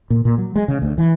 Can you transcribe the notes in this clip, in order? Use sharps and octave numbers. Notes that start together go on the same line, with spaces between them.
A#2
A#2
F#3
G#3
C#3
D2
E3